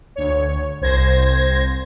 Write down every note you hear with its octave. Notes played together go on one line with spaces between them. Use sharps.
D2 C#5
C2 C5 G#6 A#6